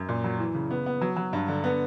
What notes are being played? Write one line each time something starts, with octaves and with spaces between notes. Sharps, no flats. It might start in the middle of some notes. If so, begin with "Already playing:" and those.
Already playing: F#2
A#2
F#3
E3
C#3
B3
B3
F#3
F#3
G2
D3
B3